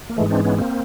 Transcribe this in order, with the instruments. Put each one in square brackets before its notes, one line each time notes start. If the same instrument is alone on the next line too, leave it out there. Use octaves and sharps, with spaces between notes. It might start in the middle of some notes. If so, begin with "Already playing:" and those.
[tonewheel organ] A#3
G#2 E3 G#3 A3
C4 D4
B3 C#4
A#3 C4